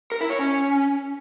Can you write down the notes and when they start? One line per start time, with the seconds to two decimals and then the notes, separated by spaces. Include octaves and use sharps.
0.12 A#4
0.21 E4
0.30 C#5
0.39 C#4